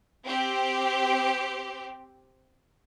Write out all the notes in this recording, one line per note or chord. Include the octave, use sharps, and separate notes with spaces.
C4 G4